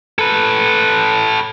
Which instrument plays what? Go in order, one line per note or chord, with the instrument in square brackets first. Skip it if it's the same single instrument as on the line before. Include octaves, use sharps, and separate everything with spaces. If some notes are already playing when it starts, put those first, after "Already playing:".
[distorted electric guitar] A4 B4